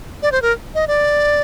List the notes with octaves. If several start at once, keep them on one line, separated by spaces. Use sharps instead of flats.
D5
C5
A#4
D#5
D5